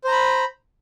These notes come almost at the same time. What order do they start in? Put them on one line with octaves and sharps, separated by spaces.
C5 A#5 B5